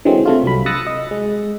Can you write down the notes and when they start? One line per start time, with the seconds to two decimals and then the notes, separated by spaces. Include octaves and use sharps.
0.05 D3 E3 F#3 G#3 C4
0.25 C3 A3 F4
0.43 C2 F#3 B5
0.66 D#6 E6 F#6 A6 A#6 C#7
0.87 D#5
1.11 G#3